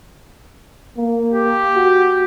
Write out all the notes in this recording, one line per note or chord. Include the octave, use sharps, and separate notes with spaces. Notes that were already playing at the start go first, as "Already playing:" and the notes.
A#3
G4
F#4